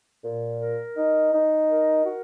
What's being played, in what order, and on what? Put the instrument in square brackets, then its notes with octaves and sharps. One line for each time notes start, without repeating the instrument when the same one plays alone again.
[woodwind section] A#2
A#4
D#4
D#4
A#4
F#4